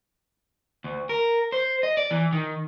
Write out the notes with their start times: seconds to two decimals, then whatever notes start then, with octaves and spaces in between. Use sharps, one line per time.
0.84 D2
1.09 A#4
1.52 C5
1.83 D#5
1.97 D5
2.11 E3
2.32 D#3